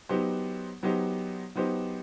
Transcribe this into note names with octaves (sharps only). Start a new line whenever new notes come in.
F#3 B3 D#4 G4 C5
F#3 B3 D#4 G4 C5
F#3 B3 D#4 G4 C5